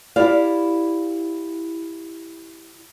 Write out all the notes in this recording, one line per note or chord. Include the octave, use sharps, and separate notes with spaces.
E4 G4 D5 F5